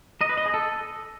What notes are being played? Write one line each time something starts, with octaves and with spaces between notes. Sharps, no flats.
D#5
B4
D#5
G#4
A4